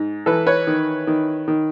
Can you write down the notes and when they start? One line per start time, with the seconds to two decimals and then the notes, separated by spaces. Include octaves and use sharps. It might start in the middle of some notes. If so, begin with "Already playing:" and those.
Already playing: G#2
0.26 E3 A4 B4
0.47 B4 C#5
0.67 D#3
1.07 D#3
1.48 D#3